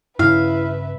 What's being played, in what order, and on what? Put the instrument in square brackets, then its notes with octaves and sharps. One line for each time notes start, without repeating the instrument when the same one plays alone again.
[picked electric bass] G2 C#3 [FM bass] E4 [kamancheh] B4 E5 [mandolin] F5